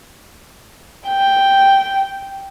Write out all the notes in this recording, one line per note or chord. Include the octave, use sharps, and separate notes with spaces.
G5